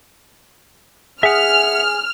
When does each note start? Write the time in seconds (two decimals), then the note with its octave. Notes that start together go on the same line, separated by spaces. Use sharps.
1.23 G#4 E5 F#5 F6